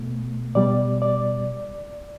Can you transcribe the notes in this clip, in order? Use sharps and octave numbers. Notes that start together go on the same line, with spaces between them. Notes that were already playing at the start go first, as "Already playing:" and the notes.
Already playing: B2 A3
B2 G3 D5
D5